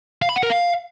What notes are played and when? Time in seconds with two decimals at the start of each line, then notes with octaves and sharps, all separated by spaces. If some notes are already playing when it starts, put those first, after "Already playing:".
0.22 F5
0.29 B5
0.36 F#5
0.43 A#4
0.50 F5